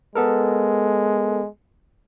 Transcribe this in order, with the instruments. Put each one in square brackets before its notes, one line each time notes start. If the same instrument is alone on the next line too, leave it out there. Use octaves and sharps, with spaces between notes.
[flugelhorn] G#3 [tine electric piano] B3 A4 A#4